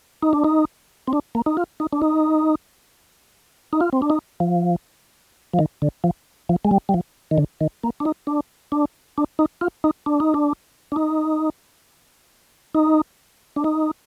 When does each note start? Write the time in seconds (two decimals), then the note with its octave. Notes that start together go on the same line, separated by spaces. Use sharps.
0.22 D#4
0.33 D4
0.44 D#4
1.08 C4
1.13 D4
1.35 A#3
1.46 D#4
1.57 F4
1.80 D#4
1.93 D4
2.02 D#4
3.73 D#4
3.81 F4
3.93 C4
4.02 D4
4.10 D#4
4.40 F3
5.53 F3
5.59 D#3
5.82 D3
6.04 F3
6.49 F3
6.65 G#3
6.71 G3
6.89 G3
6.94 F3
7.31 D#3
7.38 D3
7.61 D#3
7.84 A#3
8.00 D4
8.05 D#4
8.27 D4
8.72 D4
9.18 D4
9.39 D#4
9.61 F4
9.84 D#4
10.06 D4
10.20 D#4
10.34 D4
10.92 D4
10.96 D#4
12.75 D#4
13.56 D4
13.64 D#4